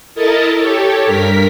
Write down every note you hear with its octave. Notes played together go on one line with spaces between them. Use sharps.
E4 A4 A#4 D#5 A5
G4 A4 C#5
G2 A#4 B6